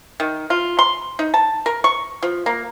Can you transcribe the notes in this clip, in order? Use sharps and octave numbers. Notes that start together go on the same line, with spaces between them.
D#3
F4
C6
D#4
A5
A#4
C#6
F3
A#3